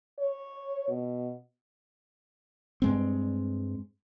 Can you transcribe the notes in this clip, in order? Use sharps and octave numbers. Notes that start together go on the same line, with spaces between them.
C#5
B2
G2 G#3 C4